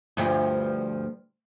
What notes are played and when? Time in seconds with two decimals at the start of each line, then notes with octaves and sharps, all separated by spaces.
0.17 D2 G2 F3